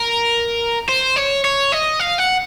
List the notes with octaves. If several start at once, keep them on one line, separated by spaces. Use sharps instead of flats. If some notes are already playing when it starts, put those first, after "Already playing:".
Already playing: A#4
C5
C#5
C#5
D#5
F5
F#5